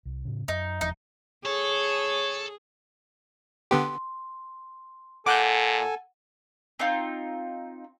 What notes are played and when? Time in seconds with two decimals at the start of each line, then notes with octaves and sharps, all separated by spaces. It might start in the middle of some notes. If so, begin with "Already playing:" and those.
0.05 C2
0.25 A2 C#3
0.48 F#2 D#4
0.81 F1 E2 F3 D#4
1.46 G#4 A4 C#5
3.71 D3 B3 G4 C6
5.26 A#2 A4 F#5 G#5 D6 F#6 G6
6.79 C4 D#4 F4